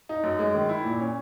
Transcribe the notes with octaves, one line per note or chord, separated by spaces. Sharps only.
D#4
F#2
G#3
D#3
E4
A#2
C#4